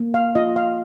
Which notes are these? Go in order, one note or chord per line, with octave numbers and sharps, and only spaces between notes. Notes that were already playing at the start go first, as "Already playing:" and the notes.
Already playing: A#3
F5
F4 D#5
F5